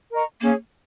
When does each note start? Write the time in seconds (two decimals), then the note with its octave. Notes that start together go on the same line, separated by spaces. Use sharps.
0.11 A#4 D#5 A#5 C#6
0.41 A#3 C#4 G#4 C#5